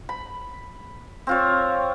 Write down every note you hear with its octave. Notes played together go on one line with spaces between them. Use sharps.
B5
C4 F4 C#5